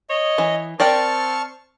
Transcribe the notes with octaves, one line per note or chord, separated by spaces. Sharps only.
C#5 D#5
E3
C4 A#4 D5 G5 A5 C#6 F6